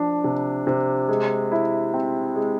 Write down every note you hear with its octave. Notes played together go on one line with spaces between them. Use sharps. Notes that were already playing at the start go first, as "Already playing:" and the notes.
Already playing: F3 D4
C3
C3
G#3
E4
C4
G#3